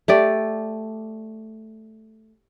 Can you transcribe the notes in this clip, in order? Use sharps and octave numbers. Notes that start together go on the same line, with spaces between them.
A3 G4 D5